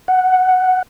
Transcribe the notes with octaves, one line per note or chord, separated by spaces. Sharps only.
F#5